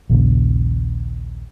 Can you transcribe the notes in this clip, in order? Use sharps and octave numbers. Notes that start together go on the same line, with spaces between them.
A#1 D#2 A#2 C#3